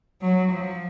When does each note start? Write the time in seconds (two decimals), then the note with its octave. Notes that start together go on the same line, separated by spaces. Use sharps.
0.22 F#3
0.52 F3